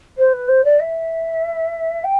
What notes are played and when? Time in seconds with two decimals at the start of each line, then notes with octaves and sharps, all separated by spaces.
0.18 C5
0.33 B4
0.48 C5
0.64 D5
0.80 E5
2.04 G5